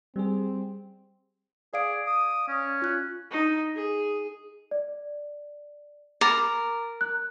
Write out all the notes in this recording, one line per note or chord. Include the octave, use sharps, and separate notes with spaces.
G3 C4 G#4
G#4 D5 F5 D7
D#6
C#4
F4 F#6
D#4
G#4
D5
A#4 D6 A6
F#6